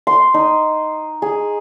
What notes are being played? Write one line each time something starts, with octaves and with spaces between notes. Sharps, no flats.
C6
D#4
G#4